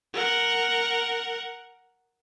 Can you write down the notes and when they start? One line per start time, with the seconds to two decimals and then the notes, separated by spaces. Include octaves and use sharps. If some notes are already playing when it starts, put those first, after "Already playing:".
0.14 A#4 F#5